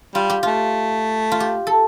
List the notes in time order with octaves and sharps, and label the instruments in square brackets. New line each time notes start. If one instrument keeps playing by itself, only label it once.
[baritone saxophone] G3 [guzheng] F4
[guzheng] G4
[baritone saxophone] A3 [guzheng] F4
[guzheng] F4
G4
A4